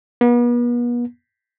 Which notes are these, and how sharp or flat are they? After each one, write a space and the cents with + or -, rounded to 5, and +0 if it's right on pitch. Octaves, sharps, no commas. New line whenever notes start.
B3 -40